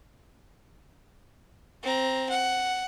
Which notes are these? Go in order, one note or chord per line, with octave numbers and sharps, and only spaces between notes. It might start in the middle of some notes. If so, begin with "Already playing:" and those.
C4 A#5
F#5